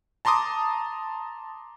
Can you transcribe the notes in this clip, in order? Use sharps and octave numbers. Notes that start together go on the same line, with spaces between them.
A5 A#5 C6 D6 D#6